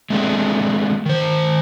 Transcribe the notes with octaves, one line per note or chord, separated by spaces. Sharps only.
G#3 A3 C4 D4 G#4
D#3 C5